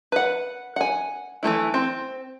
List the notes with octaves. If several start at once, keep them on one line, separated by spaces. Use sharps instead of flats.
B4 F#5
F#5 G#5
E3 G3 A3 E4
C4